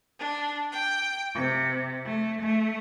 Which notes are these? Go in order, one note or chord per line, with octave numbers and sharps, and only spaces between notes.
D4
G5
C3
A3
A3